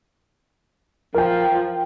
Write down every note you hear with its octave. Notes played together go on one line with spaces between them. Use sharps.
F3 A#4 G5